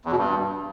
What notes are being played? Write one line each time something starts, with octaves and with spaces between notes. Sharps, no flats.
E2
B2
G2